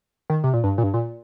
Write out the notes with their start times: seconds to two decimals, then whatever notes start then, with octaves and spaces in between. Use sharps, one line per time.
0.30 D#3
0.44 C3
0.54 A#2
0.64 G2
0.78 A#2
0.83 G2
0.94 A#2